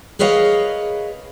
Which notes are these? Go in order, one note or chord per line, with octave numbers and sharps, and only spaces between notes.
G#4 A#4 B4 C#5 D#5 F5